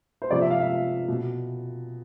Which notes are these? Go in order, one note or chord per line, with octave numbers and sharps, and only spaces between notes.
C5
C3 F3 D5
E5
F5
E5
B2